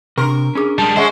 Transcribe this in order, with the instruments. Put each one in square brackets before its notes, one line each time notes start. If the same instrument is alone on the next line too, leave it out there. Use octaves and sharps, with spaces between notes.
[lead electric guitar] C3 [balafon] D4 C6 C#6 [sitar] A#4
[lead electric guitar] C#4 [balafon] D4 G#4 D6
[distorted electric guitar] G3 G#3 [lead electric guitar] A5
[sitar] G#3 C#4 [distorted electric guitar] C5 [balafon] D#5 E5 F#5